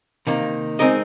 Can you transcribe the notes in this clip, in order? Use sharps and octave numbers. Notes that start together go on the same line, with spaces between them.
C3 D#3 A#3
G#3 C4 D#4 A#4 D#5